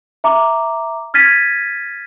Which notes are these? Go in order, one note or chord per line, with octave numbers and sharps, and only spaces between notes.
E5 A#5 D6
F6 G#6 A6 B6 D#7